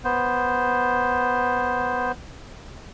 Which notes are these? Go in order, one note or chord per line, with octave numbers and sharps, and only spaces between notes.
B3 C5